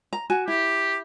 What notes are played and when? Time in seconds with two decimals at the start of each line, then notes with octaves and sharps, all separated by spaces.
0.13 A#5
0.30 F#4 G#5
0.48 E4 G4